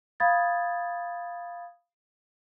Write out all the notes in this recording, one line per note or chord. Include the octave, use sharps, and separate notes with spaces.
F5 B5 D#6 G#6 A6